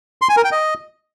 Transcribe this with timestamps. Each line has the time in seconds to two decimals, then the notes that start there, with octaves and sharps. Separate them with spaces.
0.22 C6
0.29 G#5
0.37 A#4
0.44 G5
0.52 D#5